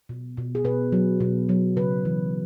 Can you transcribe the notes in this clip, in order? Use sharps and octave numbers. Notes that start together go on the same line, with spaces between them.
B2
B2
G#4
B2 B4
F#3
B2
F#3
C#3 B4
E3